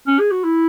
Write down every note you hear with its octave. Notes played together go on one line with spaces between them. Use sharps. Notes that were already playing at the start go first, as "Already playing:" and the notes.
C#4
G#4
F#4
E4